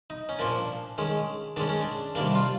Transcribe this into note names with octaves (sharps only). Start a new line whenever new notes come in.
D#4
C#4
A#2 F3 A#3 D4
D#3 G#3 C#4
D#3 G#3 C#4 D4
C#4
D4
C3 D#3 G3 A#3 D4
F4